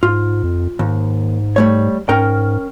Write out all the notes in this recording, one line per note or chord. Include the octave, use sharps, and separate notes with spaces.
G#2 F4
F2
D#2 G#2
G3 A3 C#5
G#2 C#4 A#4 G5